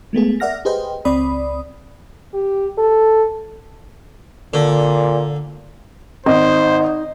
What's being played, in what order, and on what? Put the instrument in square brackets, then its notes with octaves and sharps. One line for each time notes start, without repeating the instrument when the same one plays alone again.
[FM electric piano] G#3 A3 B3 G#4
A#4 D5 E5 F#5 F6 A#6
G4 G#4 B4 C5 D#5 G5
C#2 C4 D5 B5 D#6
[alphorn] G4
A4
[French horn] A#2 [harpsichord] D3
[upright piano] G#1 [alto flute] D#4 [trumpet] C5 [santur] D#5